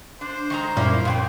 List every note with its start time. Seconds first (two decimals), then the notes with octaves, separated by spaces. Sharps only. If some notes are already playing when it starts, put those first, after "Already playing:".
0.21 D4 C5
0.50 D#3 G#3 A#5
0.77 F#2 A#2 G3 A#3 C#4 E4
1.05 F2 F#4 G5